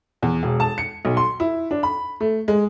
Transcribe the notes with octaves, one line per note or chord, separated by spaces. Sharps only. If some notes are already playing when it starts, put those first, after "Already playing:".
E2
E1
A5
C#7
B1
C6
E4
D4
B5
A3
G#3